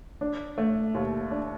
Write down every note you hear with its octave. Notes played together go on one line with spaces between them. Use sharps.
D4
A3
D#2
D4